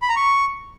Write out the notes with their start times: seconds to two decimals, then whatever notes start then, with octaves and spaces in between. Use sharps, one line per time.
0.02 B5
0.09 A#5
0.16 C#6